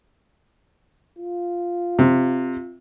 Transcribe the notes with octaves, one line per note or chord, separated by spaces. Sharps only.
F4
C3